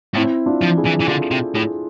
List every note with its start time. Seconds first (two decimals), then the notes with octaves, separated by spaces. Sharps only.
0.15 A2 C4 E4
0.46 D4 F4
0.62 F3
0.77 E4 G#4
0.85 E3
1.00 E3
1.08 D3 F4 A4
1.31 C3
1.55 A2 E4 G#4